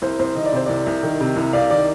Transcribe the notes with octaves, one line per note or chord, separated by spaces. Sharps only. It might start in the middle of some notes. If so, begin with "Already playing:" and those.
C2 C5
C2 C5
D#3 D#5
D5
C3 C5
C2 D5
C2
D#3
C3
C2
C2 D5 F5
D#3 D5